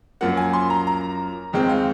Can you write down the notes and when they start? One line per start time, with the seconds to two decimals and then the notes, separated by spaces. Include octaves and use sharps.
0.21 F#2 F3 A#3 F#5
0.37 G#5
0.53 C6
0.70 A#5
0.87 A#5
1.53 F2 D#3 G#3 C4
1.69 F5